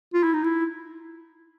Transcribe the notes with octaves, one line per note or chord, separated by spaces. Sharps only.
F4
E4
D#4
E4